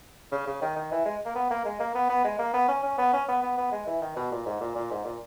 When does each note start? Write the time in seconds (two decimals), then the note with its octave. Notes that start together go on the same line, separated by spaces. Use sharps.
0.32 C#3
0.47 C#3
0.62 D#3
0.76 D#3
0.91 E3
1.06 G#3
1.25 A#3
1.35 B3
1.50 A#3
1.65 G#3
1.80 A#3
1.95 B3
2.10 B3
2.24 G#3
2.39 A#3
2.54 B3
2.68 C#4
2.83 C#4
2.98 B3
3.13 C#4
3.28 B3
3.42 B3
3.58 B3
3.72 G#3
3.86 E3
4.02 D#3
4.16 B2
4.31 A#2
4.46 G#2
4.61 A#2
4.75 A#2
4.91 G#2
5.05 A#2